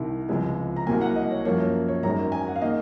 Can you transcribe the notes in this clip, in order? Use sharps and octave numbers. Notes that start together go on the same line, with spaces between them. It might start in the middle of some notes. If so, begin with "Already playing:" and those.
Already playing: C2 C3 D#3
C#2 C3 F3 G#3
A#5
C2 C3 F#3 A#3 G#5
F#5
D#5
C#5
F#2 F3 A#3 C#5
C#5
G#1 F#2 D#3 G#3 A#5
G#5
F#5
F5
D#3 A#3 D#5